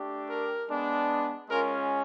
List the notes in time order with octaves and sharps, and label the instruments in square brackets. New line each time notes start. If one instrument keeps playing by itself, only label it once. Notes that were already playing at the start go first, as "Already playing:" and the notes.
Already playing: [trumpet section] A3 D4 G4
A#4
G#3 B3 D4
G#3 C#4 F4 A#4